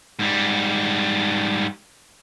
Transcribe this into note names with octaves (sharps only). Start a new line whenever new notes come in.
G#2 G3